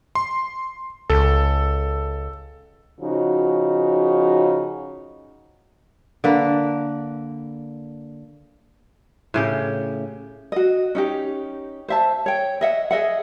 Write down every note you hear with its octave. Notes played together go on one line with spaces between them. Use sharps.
C6
C#2 A4
C#3 F3 D#4 F#4
D3 A#3 B4
A2 C#3 G4
F#4 D#5
C#4 D#4 G4
C5 E5 A5
C#5 G5
D#5 E5 F#5
G#4 D#5 E5 F#5